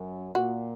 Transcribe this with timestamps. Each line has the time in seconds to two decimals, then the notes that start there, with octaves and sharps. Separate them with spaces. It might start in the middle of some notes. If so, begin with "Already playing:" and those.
Already playing: F#2
0.35 A#2 F#4